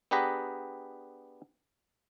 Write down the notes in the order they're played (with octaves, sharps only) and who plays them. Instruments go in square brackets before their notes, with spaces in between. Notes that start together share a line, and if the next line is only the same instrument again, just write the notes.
[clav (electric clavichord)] B3 D4 G4 G#4 B4 A#5